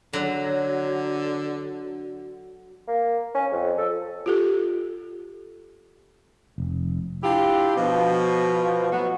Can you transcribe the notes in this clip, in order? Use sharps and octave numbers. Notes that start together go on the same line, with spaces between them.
D3 F#3
A#3
C#4
F2
A4
F4 G4 A4
F1
D4 E4 F4 G4
B2 F3
A2 F#3 B3 F#4